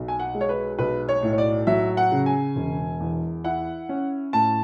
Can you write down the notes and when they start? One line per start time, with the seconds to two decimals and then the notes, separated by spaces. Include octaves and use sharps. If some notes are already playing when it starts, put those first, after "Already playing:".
Already playing: B1
0.08 G#5
0.20 F#5
0.34 G#3
0.41 C#5
0.49 B4
0.79 B1 B4
1.09 C#5
1.23 A2
1.32 C#5
1.38 D5
1.67 F#3 E5
1.97 F#5
2.12 C#3
2.26 G#5
2.56 E1
3.00 E2
3.44 E4 F#5
3.89 C#4
4.33 A2 A5